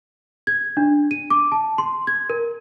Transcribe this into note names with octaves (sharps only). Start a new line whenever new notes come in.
G#6
D4
D#7
D6
A5
C6
G#6
A#4